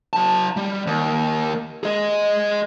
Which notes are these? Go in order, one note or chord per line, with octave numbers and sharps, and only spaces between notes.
F#3 A5
G3
D#2
G#4 D#5